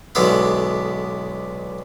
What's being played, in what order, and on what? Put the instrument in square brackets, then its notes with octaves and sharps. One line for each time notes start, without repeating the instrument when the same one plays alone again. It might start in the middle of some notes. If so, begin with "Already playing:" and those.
[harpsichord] B1 D3 G#3 B3 E4 B4